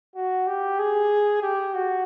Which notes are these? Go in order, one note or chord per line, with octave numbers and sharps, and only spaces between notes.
F#4
G4
G#4
G4
F#4